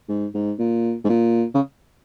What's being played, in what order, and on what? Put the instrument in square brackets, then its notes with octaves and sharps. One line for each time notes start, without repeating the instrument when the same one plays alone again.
[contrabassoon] G#2
G#2
A#2
G#2
A#2
C#3